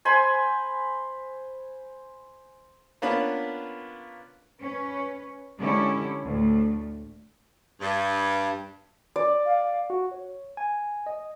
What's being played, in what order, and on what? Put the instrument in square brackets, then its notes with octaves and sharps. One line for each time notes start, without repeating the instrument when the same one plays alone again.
[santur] C5 G#5 B5 C6
[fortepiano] A#3 B3 C#4 D4 F4 B4
[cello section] C#4 B4
D3 G#3 C#4 E4 G4
D2 A2 A3
[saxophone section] G2
[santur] D5
[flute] F5
[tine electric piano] F#4
C#5
G#5
D#5